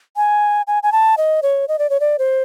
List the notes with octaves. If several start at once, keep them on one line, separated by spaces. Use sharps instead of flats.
G#5
G#5
G#5
A5
D#5
C#5
D#5
D5
C#5
D5
C5